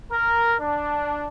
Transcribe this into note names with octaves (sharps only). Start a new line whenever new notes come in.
A#4
D4